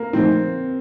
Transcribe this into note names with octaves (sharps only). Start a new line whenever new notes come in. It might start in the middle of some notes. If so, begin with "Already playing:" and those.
Already playing: A#3
A#2 F3 A3 C4 D#4